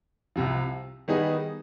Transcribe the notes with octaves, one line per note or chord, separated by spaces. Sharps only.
C2 C3 F3
D#3 G3 B3 D#4 G#4